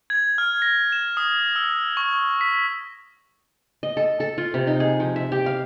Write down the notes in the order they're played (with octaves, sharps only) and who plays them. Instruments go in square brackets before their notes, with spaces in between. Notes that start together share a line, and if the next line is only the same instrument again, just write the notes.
[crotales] G#6
F6
A#6
E7
D#6
E6
C#6
B6
[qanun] D#5
A4
A4
F4
C3
D#4
G#4
F3
E5
G4
F5